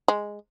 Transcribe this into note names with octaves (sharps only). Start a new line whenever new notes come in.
G#3